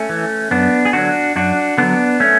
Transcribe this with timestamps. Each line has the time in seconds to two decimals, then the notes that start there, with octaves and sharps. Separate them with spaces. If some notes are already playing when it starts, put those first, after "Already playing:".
Already playing: A3 C#4
0.09 E3
0.51 F#2 B3 D4
0.85 G#4
0.93 D3 F#3 D4 F#4
1.36 F#2 D4 F#4
1.78 D3 F#3 B3 D4
2.20 A3 C#4